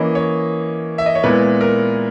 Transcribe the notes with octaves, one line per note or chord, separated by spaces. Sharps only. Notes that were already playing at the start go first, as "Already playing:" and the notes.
Already playing: E3 A#3 C#4 D#5
C#5
E5
D#5
C#5
A#2 G#3 B3 E4 B4
A#4